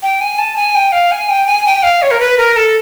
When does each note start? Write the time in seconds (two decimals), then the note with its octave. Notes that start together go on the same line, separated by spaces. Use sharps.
0.02 G5
0.21 G#5
0.39 A5
0.56 G#5
0.75 G5
0.92 F5
1.12 G#5
1.29 G5
1.47 G#5
1.66 G5
1.83 F5
2.02 C#5
2.11 A#4
2.20 B4
2.38 A#4
2.56 A4